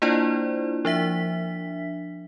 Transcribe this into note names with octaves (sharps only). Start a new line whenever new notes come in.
A#3 D4 E4 F4 C5 D5
F3 D4 E5 B6